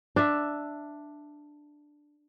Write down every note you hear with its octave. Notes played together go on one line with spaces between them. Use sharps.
D4 E5